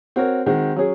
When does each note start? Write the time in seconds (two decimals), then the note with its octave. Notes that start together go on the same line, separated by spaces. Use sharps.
0.16 C4 F#4 A#4 C#5
0.46 D#3 G#3 C4 F#4
0.76 F#3 C#4 G#4